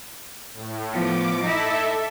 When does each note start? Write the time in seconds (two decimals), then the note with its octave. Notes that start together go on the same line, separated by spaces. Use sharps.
0.53 A2
0.92 F3 B3 D6
1.41 D#4 E4 A4 E5